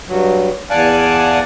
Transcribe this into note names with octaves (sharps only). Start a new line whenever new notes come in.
G2 F#3
E2 D5 F5 F#5 G#5 A5